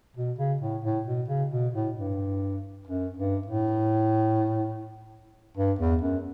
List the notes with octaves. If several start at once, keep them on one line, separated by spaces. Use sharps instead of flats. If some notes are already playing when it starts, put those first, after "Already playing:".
B2
C#3
A2
A2
B2
C#3
B2
A2
G2
F#2
G2
A2
G2
E2
F#2